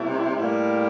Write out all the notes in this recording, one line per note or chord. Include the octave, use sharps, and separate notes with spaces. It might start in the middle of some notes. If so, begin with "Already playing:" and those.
Already playing: C3 G3 A#3 E4
A2 G3 A#3